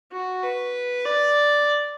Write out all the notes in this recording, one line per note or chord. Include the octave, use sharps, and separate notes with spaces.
F#4
B4
D5